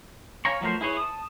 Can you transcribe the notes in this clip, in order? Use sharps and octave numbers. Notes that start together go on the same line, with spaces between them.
C#5 F5 G#5 A#5 C#6
F3 F#3 A3 A#4 C5
E4 G#4 B4 C#5
A5 D#6